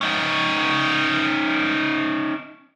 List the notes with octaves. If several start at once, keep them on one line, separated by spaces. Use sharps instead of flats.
C#4 D#4